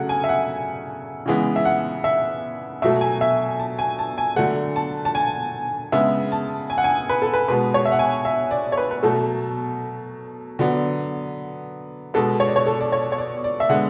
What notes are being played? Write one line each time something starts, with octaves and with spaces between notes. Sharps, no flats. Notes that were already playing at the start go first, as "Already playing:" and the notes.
Already playing: C#3 F#3 A3 F#5
G#5
E5
F#5
C#3 E3 G#3 B3
E5
F#5
E5
B2 F#3 A3 E5
G#5
E5
A5
G#5
A5
G#5
D3 F#3 A3 F#5
A5
A5
G#5
C#3 G#3 B3 E5
A5
G#5
F#5
G#5
B4
A4
B4
B2 G#3 B3 B4
C#5
E5
F#5
G#5
E5
D5
C#5
B4
B4
B2 F#3 A3 A4
D3 F#3 B3
B2 G#3 B3 A4
C#5
D5
C#5
A4
D5
C#5
C#5
D5
D5
E5
D3 G#3 B3 F#5